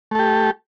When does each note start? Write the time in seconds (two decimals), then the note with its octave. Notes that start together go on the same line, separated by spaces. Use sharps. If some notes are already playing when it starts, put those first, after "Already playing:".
0.11 A3
0.15 A4
0.19 G4